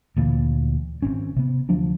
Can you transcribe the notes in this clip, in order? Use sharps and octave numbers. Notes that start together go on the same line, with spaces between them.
D2 A#2 E3
G#1 C4 C#4
C3 B3
D2 F3 F#3 D4